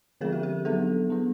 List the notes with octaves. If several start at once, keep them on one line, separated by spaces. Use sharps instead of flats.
D3 F3 G#3 C4 G#4 A#4
G4
G4
F#3 B3 D4 G4 A4
G3 B3 D4